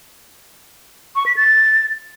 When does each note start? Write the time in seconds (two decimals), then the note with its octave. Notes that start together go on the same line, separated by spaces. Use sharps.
1.16 C#6
1.26 B6
1.36 A6